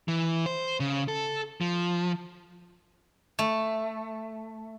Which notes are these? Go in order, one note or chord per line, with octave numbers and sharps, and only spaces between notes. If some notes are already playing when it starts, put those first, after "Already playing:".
E3
C5
C#3
A4
F3
A3